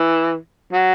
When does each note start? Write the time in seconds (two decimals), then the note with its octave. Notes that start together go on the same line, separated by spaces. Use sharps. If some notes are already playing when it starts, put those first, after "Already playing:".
Already playing: E3
0.72 F#3